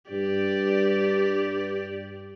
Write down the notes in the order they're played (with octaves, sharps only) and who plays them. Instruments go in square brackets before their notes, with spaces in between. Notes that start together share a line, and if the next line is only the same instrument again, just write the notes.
[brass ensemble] G2 [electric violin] G4 D5